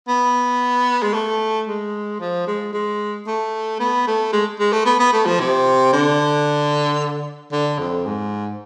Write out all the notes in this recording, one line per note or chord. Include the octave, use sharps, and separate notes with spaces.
B3
G#3
A3
G#3
F3
G#3
G#3
A3
B3
A3
G#3
G#3
A3
B3
B3
A3
F3
C3
D3
D3
F2
G#2